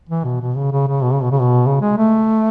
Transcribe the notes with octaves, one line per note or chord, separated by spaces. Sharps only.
E3
B2
B2
C#3
C#3
C#3
B2
C#3
B2
C#3
B2
C#3
G#3
A3